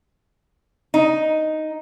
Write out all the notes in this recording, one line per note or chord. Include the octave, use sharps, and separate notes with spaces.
D#4